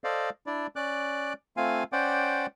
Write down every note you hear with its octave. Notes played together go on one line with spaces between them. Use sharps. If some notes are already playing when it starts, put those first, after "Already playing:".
A4 C5 D5 D#5 F5
D4 E4 D5
C#4 D5 D6 F#6
A3 C4 F4 F5 G#5
C#4 C5 D5 F#5 G5 D6